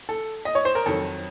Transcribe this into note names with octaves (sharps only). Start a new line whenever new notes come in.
A4
D#5
C#5
C5
A#4
F2 D#3 F#3 A4